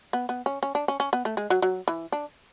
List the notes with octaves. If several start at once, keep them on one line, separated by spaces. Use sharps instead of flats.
B3
B3
C#4
C#4
D4
C#4
C#4
B3
A3
G#3
F#3
F#3
E3
D4